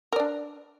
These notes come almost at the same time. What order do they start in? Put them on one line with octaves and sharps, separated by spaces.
A#4 D5 D4